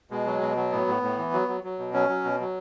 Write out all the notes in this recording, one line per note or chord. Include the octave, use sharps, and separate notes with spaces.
B2 G#3
F#3
B2
F#3
A2 B3
A2
A2
E3
F#3
F#3
F#3
B2
F#3 C#4
F#3
B2
F#3